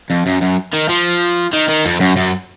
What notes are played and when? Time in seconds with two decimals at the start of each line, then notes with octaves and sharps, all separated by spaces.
0.10 F2
0.27 F#2
0.42 F#2
0.73 D#3
0.89 F3
1.53 D#3
1.69 D#3
1.85 F2
2.00 F#2
2.16 F#2